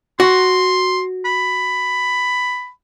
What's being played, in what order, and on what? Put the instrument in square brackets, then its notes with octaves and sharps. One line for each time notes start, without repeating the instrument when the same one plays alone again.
[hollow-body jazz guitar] F#4 [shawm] C6
[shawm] B5